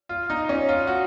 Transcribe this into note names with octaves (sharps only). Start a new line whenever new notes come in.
F4
D#4
C#4
F4
F#4